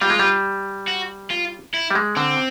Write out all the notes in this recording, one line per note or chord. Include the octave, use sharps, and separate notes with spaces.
G3 F4
G#3
G3
F#4
F4
E4
G3
G#3
D3 C4